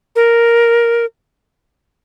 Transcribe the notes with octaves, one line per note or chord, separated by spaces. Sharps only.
A#4